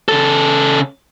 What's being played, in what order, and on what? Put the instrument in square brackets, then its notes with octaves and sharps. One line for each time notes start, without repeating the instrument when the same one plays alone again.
[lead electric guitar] C#3 A4